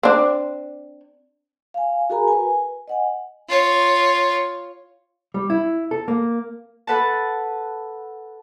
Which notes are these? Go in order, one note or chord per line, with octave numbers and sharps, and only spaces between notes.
C4 D4
F5 G#5
F#4 G#4 A#4 G#5 A#5 B5
B4 G#5
D#5 F#5 G#5
F4 C#5
G3
E4
A4
A#3
A4 B4 F#5 A5